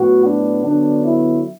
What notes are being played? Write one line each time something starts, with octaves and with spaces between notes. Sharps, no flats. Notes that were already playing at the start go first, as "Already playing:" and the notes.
Already playing: A2 F#3 B3 F#4
D4
D3 F#3 B3 D4
E4